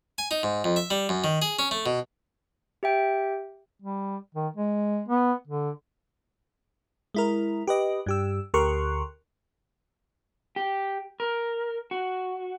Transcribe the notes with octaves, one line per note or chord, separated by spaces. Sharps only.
G#5
D#4
G#2
F2
E5
G3
F#2
D#3
G#4
C#4
A3
B2
G4 E5 G5
G3
D#3
G#3
B3
D3
G#3 E4 A#4
G4 B4 D#5
G2 G4 E6
D2 G4 A#4 C6 C#6 F#6
G4
A#4
F#4